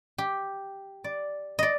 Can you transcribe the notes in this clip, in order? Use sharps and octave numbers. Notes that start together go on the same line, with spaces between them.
G4
D5
D5 D#5